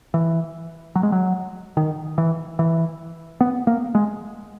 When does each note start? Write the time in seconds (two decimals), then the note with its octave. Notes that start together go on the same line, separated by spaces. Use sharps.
0.14 E3
0.96 F#3
1.03 G#3
1.12 F#3
1.77 D#3
2.18 E3
2.59 E3
3.41 B3
3.67 A#3
3.95 G#3